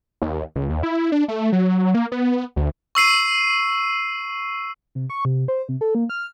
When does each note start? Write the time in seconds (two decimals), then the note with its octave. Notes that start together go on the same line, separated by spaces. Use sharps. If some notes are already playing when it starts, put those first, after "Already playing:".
0.22 D#2
0.56 C#2
0.70 D#2
0.83 E4
1.12 D4
1.28 A3
1.52 F#3
1.94 A#3
2.12 B3
2.56 D2
2.95 C#6 E6 C7 D#7
4.95 C3
5.10 C#6
5.25 C3
5.48 C5
5.69 C3
5.81 A4
5.95 A#3
6.09 F6